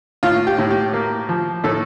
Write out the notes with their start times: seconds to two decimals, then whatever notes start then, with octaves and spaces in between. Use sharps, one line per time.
0.23 A2 F4
0.47 G4
0.58 A2
0.71 G4
0.94 A#3
1.29 F3
1.64 A2 A3 A4